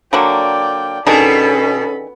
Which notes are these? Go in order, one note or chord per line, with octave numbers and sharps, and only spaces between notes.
D3 F#3 A#3 D5 G5
B2 D#3 C#4 D4 G#4 A4 B5